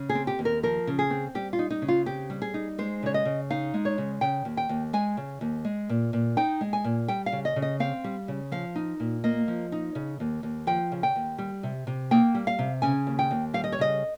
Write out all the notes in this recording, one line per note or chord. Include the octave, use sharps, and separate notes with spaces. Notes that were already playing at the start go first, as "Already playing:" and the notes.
Already playing: C#3
G#4
C4
G4
D#2
A#4
F3 A#4
C#3
G#4
C4
G3 G4
F4
D#4
D#4
C#3
F4
C4 G4
G3
G#4
D#4
G#3 C5
C#3 C#5
D#5
C#3
D#4 F5
G#3
C#5
C#3
C#3 G5
D#2
G5
D#2
G#3 G#5
C#3
D#2
G#3
A#2
A#2
D#4 G5
G#3
G#5
A#2
G3 G5
F5
C#3
D#5
C#3
D#5
C4 F5
G3
C#3
F3 F5
D#4
A#2
A#3 D#5
F3
D#4
C#3
D#2
D#2
F3 G5
C#3
G5
D#2
G3
C3
C3
A#3 G5
G3
F5
C3
C#3 G#5
D#2
G5
D#2
G3 F5
D#5
C#5
C#3 D#5